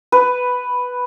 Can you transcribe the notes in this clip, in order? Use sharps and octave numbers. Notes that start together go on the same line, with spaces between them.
B4